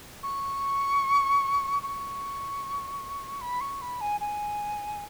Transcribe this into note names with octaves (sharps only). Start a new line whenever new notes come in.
C#6
C#6
B5
C#6
B5
G#5
G#5